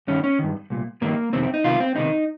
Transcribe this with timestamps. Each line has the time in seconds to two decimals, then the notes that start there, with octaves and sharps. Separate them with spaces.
0.07 G2 D#3 C#4
0.24 C#4
0.39 G2 D#3
0.70 C2 A#2
1.02 G2 D#3 A#3
1.33 F2 C3 D#3 C4
1.43 C4
1.54 D#4
1.64 C2 C3 D#3 F4
1.80 C4
1.95 C#2 C3 D#3 D#4